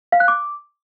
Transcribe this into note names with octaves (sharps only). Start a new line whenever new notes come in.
F5
F#6
D6